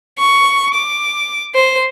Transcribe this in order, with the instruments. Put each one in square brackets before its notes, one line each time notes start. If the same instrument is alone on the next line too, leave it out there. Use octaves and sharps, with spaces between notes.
[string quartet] C#6
D6
C5